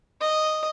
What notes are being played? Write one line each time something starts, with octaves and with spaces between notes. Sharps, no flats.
D#5